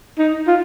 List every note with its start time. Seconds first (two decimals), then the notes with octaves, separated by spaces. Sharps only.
0.19 D#4
0.47 F4